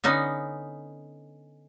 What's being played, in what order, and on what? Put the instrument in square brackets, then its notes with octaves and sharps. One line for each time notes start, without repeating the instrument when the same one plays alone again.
[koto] D3 B3 C#4 D#4